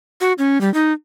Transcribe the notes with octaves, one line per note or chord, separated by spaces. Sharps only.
F#4
C#4
G3
D#4